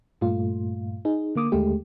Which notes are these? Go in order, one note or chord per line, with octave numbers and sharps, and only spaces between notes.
G2 A#2 A3 F4
D#4 G#4
D3 A#3 D6 D#6
D#2 D3 G#3 A3 G4